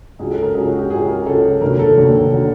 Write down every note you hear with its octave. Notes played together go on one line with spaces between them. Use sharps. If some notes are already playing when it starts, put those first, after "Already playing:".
C#2 C#3 F#3 G#4
A4
A#4
C#2 C#3 F#3 G#4
F#4
G4
C#2 C#3 F#3 G#4
A#4
C#2 C#3 F#3 A4
F1 D#2 D3 F#3 A#4
A4
F1 D#2 D3 F#3
D3 F#3